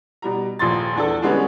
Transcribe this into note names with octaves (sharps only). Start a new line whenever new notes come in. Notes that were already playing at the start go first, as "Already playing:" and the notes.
B2 G3 A#5
D#1 A#1 F3 C6 A6
E2 D4 A4
D3 G3 G#3 B3 C#4